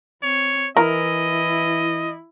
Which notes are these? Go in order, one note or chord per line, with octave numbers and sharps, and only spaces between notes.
C4 C#5
E3 E4 A#4 D#5